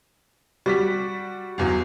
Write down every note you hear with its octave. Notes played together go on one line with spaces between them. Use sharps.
G3 F#4 G4 D5 B6
G1 E2 F#3